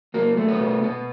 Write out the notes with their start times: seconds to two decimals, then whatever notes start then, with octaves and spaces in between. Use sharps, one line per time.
0.14 F#3 A#3
0.37 A3
0.48 B3
0.60 B2
0.83 B2 B3